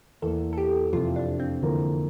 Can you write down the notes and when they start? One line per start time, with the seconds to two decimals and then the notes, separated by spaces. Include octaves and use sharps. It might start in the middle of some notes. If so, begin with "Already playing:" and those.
0.22 E2 E3 A#3 A4
0.53 A4
0.57 G4
0.92 F2 C3 E3 F4
1.16 D4
1.40 C4
1.63 F2 D3 E3 A#3 F4 A#4